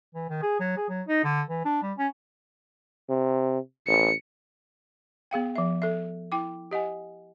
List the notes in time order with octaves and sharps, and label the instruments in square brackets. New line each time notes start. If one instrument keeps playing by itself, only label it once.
[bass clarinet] E3
D#3
G#4
F#3
G#4
F#3
D#4
D3
E3
D4
G3
C#4
[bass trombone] C3
[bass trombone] A1 [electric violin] C#7
[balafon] B3 G#4 F5 G5
F3 E5
A4 E5
E4 G5 D6
G4 D#5 F#5 G#5